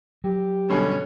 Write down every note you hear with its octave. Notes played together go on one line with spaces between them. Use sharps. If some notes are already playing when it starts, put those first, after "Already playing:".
F#3 G4
G2 B2 D3 C#4